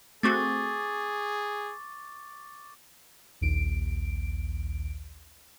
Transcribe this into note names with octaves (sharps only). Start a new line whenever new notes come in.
A3 C4 F#4 G#4 C#6 D6 A6
A#1 D#2 D7